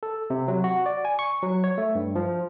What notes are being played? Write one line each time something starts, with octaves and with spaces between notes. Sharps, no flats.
A4
C3
F#3
F#4
D5
G#5
C#6
F#3
C#5
A3
G2
F3